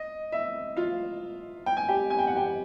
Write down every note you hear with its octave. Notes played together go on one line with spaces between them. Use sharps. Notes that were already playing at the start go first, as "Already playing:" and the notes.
Already playing: D#5
E5
F4 F5
G5
G#5
G4 G5
G#5
G5
F#5
G4 G5